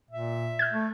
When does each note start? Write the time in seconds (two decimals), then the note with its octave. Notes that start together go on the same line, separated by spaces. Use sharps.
0.11 A#2 E5
0.59 F6 G6 G#6
0.73 A3